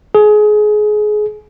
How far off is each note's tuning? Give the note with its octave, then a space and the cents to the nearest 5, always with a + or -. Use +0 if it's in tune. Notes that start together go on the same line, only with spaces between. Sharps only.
G#4 +25